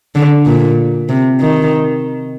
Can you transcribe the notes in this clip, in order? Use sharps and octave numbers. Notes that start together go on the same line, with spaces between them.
D3
A#2
C3
D#3